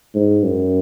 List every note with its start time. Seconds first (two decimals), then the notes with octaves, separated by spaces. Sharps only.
0.15 G#2
0.43 F#2